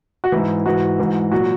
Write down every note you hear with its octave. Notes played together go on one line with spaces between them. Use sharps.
F#4
G#2 E3 E4
G#2 E3 F#4
G#2 E3
A#2 F#3 F#4